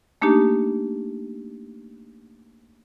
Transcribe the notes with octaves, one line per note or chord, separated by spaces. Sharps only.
A3 A#3 D4 D#4 G4